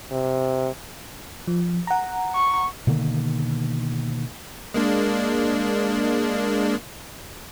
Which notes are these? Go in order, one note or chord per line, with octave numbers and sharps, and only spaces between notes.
C3
F3
F#5 A#5
C#6
B2 D3 D#3 A#3
G#3 A#3 D4